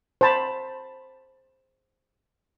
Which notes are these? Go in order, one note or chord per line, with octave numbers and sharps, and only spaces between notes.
C5 A5 B5